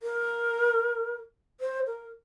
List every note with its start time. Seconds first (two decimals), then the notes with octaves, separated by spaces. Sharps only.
0.03 A#4
1.61 C5
1.87 A#4